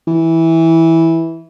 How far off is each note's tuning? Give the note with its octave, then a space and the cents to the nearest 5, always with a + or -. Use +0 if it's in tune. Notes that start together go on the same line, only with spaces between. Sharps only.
E3 -10